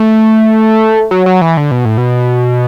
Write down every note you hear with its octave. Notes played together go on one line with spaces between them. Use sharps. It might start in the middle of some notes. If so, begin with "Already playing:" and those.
Already playing: A3
F#3
F#3
E3
D3
B2
A2
B2